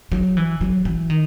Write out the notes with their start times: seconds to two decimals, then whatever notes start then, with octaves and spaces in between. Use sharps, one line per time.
0.12 F#3
0.37 E3
0.61 F#3
0.85 E3
1.10 D#3